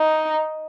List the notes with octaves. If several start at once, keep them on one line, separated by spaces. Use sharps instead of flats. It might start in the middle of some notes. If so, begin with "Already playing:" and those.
Already playing: D#4